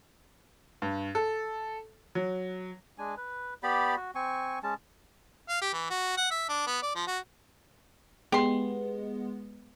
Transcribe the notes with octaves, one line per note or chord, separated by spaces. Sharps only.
G2
A4
F#3
G#3 D4 G#5
B4
B3 G4 D5 B5
F#4
C4 G#5 C#6
G#3 C#4 A5
F5
G4
E3
F#4
F#5
E5
D4
B3
D5
F3
F#4
G#3 B3 G4 C6